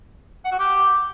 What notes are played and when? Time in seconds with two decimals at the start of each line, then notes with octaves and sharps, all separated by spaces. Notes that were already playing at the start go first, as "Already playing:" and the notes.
0.45 F#5
0.52 F#4
0.59 G4